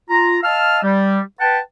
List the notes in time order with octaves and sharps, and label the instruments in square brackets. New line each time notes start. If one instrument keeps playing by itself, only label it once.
[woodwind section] F4 A#5
D#5 F5 A5 E6 F6
G3
B4 F#5 G5 A5